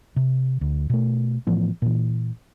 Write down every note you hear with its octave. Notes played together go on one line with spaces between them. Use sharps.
C3
D2
B2 A3
A2 E3 F3 B3
A#2 E3